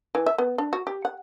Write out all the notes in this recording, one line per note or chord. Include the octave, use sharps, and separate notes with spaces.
E3
E5
B3
D4
F#4
G4
F#5